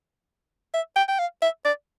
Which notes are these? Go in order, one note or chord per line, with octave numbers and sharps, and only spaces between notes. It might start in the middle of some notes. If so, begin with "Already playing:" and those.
E5
G5
G5
F5
E5
D5